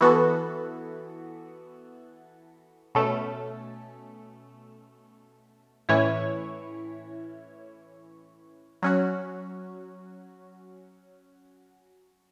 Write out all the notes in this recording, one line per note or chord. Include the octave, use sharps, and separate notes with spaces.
E3 B3 F#4 A4
B2 A3 C#4 A4
A2 E3 C#4 E4 C#5
F#3 C#4 F#4